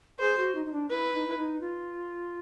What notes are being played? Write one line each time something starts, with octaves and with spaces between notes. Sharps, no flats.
G#4 C5
F#4
D#4
D#4
D4
E4 B4
D#4
E4
D#4
F4